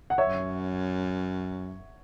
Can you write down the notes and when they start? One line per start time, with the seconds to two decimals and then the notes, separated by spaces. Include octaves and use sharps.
0.10 F#5
0.18 F#2 C#5 E5